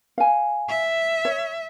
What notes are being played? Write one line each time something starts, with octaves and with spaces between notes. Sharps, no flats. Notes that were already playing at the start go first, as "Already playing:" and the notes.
F5 G#5
E5
C#5